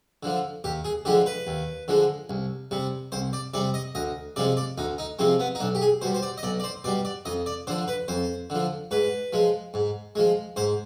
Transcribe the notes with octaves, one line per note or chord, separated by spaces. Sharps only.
D3 F3
D#2 G4
G#4
D3 F3 G#3 G4
B4
D#2
D3 F3 G#3
C2
C3 G3
C2 C5
D5
C3 G3 D5
D#5
D2 D#5
C3 F3 G#3 D5
D5
D2 D#4
D#4
C3 F3 G#3 C4
B3
D#4
B1 D4
G4
G#4
B2 G3 C5
C5
D5
D#5
B1 D5
D5
C5
B2 G3 D5
D5
F2 D#5
D5
D3 F3 C5
B4
F2 C5
D3 F3
G#2 B4
F3 G#3
G#2
F3 G#3
G#2 C5